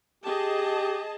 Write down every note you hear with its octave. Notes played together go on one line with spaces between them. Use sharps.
G4 G#4 D#5 A5